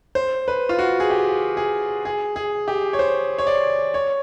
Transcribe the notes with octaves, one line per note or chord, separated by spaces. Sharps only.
C5
B4
F4
F#4
G#4
G4
G#4
G#4
G#4
G4
C#5
C5
C#5
D5
C#5